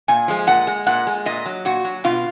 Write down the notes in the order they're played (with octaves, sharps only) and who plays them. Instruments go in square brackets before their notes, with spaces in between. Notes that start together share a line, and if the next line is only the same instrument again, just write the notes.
[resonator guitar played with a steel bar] A#2 G#5
F3 G#3
A#2 F#5
G#3
A#2 F#5
G#3
A#2 D#5
F#3
A#2 F#4
F#3
B2 F4